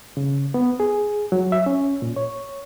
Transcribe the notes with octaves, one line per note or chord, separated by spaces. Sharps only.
C#3
B3
G#4
F#3
E5
C#4
A#2
C#5